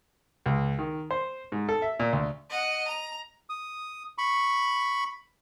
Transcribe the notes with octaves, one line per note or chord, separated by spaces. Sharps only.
C#2
D#3
C5
G#2
A4
E5
A#2
D2
D#5 F#5
A#5
D#6
B5 C#6